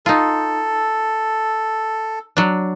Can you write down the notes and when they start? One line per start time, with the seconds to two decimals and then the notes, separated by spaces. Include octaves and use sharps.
0.06 D#4 F4 A4
2.37 F#3 D4